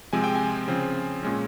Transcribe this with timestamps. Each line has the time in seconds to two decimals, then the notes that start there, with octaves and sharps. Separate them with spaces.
0.13 C3 F3 G#3 C4 G#5
0.24 G5
0.35 G#5
0.68 C#3 F3 C4
1.23 A#2 G#3 C#4